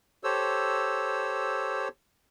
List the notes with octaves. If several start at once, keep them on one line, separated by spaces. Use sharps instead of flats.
G4 A4 C5 C#5 E6